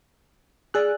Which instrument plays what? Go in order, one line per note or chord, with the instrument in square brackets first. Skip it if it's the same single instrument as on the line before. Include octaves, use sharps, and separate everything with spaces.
[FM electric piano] G#4 F#6 [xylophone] D5 G#5 E6